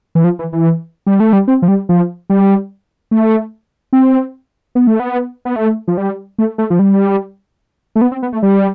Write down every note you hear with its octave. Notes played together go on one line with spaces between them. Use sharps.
E3
F3
E3
E3
G3
A3
G3
C4
F3
G3
F3
G3
A3
C4
B3
A3
B3
B3
A3
F3
G3
A3
A3
F3
G3
A3
B3
C4
B3
A3
G3